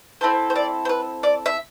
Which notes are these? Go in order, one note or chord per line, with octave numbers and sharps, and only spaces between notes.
C4 E4 A4 C5
C5
D5
C5
B4
D5
E5